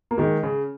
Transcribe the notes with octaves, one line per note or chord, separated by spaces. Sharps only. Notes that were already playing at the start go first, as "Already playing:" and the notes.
A#3
D#3 G#3
C#3